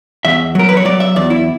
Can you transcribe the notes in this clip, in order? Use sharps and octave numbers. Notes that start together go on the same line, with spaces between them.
E2 E5
F#3 A#4
B4
C#5
F#3 D5
E5
E2 D5
E4